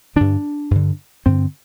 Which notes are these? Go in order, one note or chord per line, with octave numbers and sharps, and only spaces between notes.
G2 D3 D4
G2 D3
G2 D3 C4